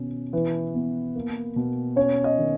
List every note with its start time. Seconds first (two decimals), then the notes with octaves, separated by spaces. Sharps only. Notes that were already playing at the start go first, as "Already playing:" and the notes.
Already playing: B2 D#3 C#4
0.33 E3 B4
0.74 B3
1.16 A#3
1.56 B2
1.96 C#4 C#5
2.24 D#5
2.38 D#3